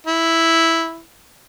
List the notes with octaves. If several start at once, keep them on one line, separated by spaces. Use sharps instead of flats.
E4